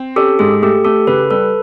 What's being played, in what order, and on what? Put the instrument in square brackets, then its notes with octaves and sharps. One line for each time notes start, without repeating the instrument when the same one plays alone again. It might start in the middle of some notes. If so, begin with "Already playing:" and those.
Already playing: [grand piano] C4
[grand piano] C#4 [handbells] G4 A4
[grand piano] G#2 [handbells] G#4
[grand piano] A3 [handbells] G4 A4
[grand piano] A3 [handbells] G4 A4
[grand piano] C#3 [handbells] A4 B4
[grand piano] G3 [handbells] A4 B4